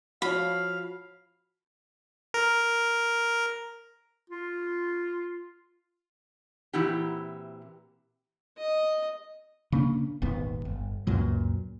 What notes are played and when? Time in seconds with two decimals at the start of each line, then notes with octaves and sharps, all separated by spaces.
0.22 F3 F4 F#4 C#5 F5 B5
2.34 A#4
4.30 F4
6.73 A#2 E3 C4 E4 F#4 G4
8.58 D#5
9.72 C#3 A#3 D4
10.22 D#1 G#1 D#2 B3
10.65 G1
11.07 C#2 F#2 A#2 F#3